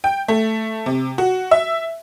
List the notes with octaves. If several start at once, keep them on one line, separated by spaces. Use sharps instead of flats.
G5
A3
C3
F#4
E5